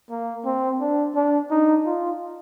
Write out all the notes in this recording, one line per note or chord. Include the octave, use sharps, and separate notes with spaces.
A#3
C4
D4
D4
D#4
F4